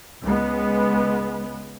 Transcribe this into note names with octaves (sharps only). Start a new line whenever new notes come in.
C#2 G#3 B3